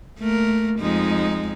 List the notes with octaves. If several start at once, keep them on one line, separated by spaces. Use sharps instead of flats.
A3 A#3 A#4
F2 G#3 D#4